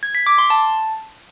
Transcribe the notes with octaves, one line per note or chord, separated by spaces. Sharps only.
G#6
B6
D6
C6
A5